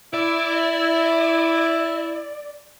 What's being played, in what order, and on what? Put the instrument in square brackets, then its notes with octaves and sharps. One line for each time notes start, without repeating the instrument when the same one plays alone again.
[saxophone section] E4 [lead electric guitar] D5